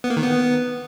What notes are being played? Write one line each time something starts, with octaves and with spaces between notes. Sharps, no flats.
B3
A#3
D#3
B3